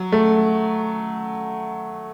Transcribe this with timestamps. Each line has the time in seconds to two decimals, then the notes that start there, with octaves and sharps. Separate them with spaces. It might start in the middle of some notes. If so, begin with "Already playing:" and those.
Already playing: F#3
0.12 A3